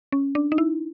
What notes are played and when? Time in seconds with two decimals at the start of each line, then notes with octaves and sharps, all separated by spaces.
0.12 C#4
0.35 D4
0.52 D#4
0.58 E4